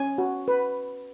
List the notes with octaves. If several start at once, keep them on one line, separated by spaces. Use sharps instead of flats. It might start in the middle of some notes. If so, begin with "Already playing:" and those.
Already playing: C#4 G#5
F#4
B4